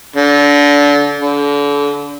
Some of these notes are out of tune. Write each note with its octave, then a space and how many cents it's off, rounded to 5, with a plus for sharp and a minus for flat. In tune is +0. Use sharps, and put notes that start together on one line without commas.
D3 -25
D3 -35